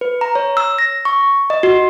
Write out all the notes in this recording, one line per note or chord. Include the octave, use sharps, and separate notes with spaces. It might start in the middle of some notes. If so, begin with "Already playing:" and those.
B4
A#5
C#5
E6
A#6
C#6
D#5
F#4